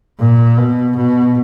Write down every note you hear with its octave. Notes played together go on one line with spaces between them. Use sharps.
A#2
B2
B2